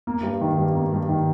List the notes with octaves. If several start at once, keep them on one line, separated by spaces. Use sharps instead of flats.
A#3
G2
D#3
G2
A#3
G2
D#3